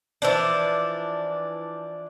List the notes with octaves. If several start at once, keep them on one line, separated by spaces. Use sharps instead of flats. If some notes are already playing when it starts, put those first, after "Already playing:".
E3 F3 D4